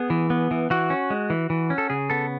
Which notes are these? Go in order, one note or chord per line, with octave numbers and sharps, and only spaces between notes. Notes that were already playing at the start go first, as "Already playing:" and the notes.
Already playing: B3 G#4
E3
B3
E3
E3 F#4
C#4
G#3
E3
E3
C#4
A4
C#3 G#4
B3 A4